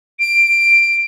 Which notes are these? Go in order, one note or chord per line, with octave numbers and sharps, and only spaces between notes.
D7